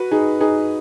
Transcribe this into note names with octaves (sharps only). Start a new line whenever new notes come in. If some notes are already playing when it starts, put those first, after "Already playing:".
Already playing: F#4 B4
D#4 G#4
D#4 G#4